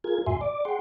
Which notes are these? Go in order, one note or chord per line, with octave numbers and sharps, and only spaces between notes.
F4 G#4 A#4 G#6
F2 A2 F#4 E5 G#5 C6
D5 D6
G#4 F#5 G5 C6